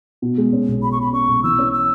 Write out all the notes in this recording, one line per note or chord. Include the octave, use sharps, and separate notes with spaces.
B2
G#3
C#4
B1
B2 B5
C#6
G#3 B5
C#4 C#6
B1
E3 E6
C#4
E6